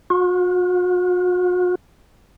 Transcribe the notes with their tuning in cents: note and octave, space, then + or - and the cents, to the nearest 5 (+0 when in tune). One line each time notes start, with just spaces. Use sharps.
F#4 -45